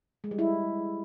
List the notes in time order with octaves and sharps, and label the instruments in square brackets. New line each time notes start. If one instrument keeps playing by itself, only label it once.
[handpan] G#3
G3
E4